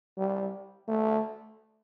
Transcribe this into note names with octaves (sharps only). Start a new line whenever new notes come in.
G3
A3